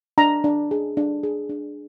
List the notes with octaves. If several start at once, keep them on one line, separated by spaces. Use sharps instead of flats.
D4 A#5
D4
G#4
D4
G#4
D4